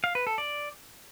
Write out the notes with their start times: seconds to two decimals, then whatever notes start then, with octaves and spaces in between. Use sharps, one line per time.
0.04 F5
0.15 B4
0.27 A4
0.38 D5